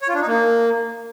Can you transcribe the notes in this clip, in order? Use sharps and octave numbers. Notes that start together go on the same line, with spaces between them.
C#5
F4
D4
D#4
A#3